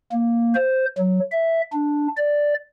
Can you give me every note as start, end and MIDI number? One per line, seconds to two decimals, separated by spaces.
0.12 0.55 58
0.55 0.86 72
0.98 1.19 54
1.32 1.61 76
1.73 2.08 62
2.17 2.54 74